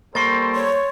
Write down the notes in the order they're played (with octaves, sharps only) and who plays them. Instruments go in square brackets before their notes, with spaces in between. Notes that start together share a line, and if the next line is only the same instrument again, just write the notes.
[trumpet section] G3 A4 C5 [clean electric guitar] A#3 [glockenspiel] C6 C#6 A6
[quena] C#5